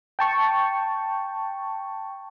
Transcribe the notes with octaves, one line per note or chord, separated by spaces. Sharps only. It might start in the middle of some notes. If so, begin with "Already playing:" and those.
G5 A5 C#6